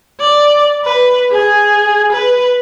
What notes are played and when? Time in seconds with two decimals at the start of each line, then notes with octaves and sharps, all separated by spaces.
0.21 D5
0.84 B4
1.31 G#4
2.12 B4